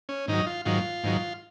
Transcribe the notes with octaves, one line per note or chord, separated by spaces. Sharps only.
C#4
G#2 D#3 F#3 D#4
F4
G#2 D#3 F#3 F4
G#2 D#3 F#3